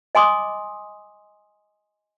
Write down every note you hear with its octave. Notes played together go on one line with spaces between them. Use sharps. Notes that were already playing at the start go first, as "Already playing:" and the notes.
D#5 G#5 C6 D6 D#6